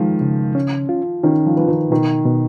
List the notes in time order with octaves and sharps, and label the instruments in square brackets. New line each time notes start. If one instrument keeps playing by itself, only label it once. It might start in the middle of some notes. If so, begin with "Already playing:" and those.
Already playing: [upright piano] D#3 F3 [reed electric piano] G#3
[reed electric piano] C#3
C#4
F4
[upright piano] D#3 [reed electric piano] C#4
[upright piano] F3
[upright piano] F3 [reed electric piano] B4
[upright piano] D#3
[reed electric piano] B2 [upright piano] D#3
[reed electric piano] B2